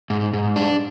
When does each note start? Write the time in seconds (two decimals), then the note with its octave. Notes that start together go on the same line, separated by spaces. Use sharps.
0.10 G#2
0.33 G#2
0.56 D4